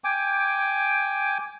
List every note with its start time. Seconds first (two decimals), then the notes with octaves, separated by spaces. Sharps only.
0.04 G5 G#5 D6